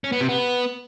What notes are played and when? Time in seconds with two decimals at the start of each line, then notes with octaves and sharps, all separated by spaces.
0.04 C#4
0.12 B3
0.21 C3
0.29 B3